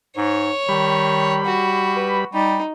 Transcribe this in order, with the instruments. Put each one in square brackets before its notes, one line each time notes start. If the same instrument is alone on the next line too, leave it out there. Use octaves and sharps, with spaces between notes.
[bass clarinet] G#2 [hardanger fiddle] C#5
[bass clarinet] D#3 [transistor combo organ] G3 B5
[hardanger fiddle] F#4
[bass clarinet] B4
[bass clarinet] G3 [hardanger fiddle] D#4